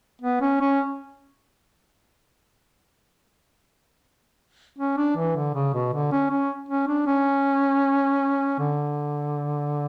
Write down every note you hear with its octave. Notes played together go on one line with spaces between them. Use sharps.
B3
C#4
C#4
C#4
D4
E3
D3
C#3
B2
D3
C#4
C#4
C#4
D4
C#4
D3